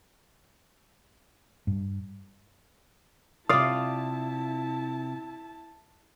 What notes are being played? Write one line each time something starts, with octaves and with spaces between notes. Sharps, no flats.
G2
C3 E4 F4 D5 F5 A5 D#6